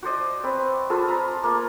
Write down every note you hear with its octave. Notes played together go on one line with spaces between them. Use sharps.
F#4 C5 D5 D#5
C4 B4
F4 G#4 A4 B4
A#5 B5
A3 A#3